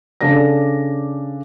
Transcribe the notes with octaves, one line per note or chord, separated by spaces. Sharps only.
C#3 D4 A4 D5 A#6